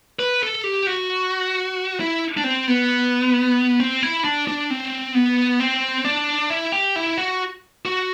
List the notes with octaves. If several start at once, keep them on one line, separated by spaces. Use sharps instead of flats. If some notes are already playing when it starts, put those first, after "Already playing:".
B4
A4
G4
F#4
E4
D4
C4
B3
C4
E4
D4
D4
C4
B3
C4
D4
E4
G4
E4
F#4
F#4